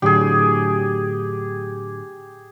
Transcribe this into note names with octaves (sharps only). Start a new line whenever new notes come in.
A2 D3 F#3 G4 G#4